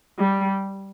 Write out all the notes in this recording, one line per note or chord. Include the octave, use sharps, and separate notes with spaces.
G3